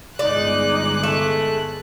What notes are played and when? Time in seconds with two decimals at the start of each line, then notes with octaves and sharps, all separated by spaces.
0.19 G1 G#3 D#4 D5 D6 F#6
1.03 A3